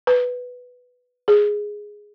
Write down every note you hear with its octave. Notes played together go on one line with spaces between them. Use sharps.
B4
G#4